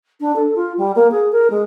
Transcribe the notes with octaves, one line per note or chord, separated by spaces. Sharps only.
D4
A4
F4
G3
A#3
G#4
A#4
G#3